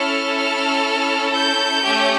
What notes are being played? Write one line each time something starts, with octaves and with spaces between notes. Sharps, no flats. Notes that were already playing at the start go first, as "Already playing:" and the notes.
Already playing: C#4 E4 A4 F6
F6
G6
A3 C#4 G4